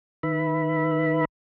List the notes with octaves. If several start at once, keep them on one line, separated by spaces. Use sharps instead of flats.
D#3 B4 E5 B5